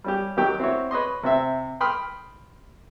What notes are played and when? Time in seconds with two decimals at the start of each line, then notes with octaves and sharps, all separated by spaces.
0.04 G3 C#4 G4
0.37 D#2 D#3 F#3 G4 G5 C#6
0.60 C4 E4 F#4 C#5
0.91 B4 C#5 D#5 C6
1.23 C3 C4 E5
1.81 G5 B5 C6 D#6 F6